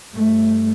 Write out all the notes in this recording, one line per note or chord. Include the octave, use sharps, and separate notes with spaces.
G2 A3